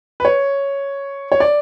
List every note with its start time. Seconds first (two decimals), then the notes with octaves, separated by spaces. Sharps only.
0.20 B4
0.25 C#5
1.32 C#5
1.40 D5